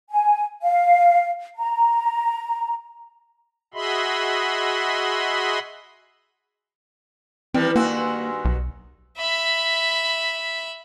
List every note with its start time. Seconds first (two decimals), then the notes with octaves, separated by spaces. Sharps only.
0.11 G#5
0.62 F5
1.56 A#5
3.74 F#4 G#4 D#5 E5 B5 C6
7.54 D#3 E3 G3 C4 E4 B4
7.76 G2 D#3 A#3 F#4 G#5 C6 E6
8.45 B1
9.17 E5 B5